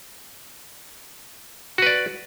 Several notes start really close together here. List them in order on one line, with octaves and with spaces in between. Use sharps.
F#4 B4 D5